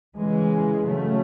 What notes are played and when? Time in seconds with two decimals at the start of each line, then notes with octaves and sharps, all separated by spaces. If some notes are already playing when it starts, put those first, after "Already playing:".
0.17 C#3 E3 G#3
0.85 C#3 F#3 A3